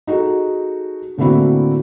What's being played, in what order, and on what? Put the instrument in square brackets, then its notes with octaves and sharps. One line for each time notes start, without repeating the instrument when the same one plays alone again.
[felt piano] D#4 F#4 G#4 A4
A2 D3 A#3 C4 E4 F#4